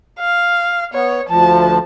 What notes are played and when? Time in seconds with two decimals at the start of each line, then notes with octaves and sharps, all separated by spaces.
0.20 F5
0.94 B3 C#5
1.29 D2 F3 A5